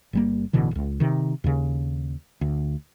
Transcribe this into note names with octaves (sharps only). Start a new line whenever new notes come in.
G1 G3 A#3
A1 B2 D3 E3
E1 C#2
C3 D#3
D#2 C#3
D2